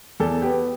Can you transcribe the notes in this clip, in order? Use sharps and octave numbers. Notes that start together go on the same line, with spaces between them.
E2 A4
B3 G4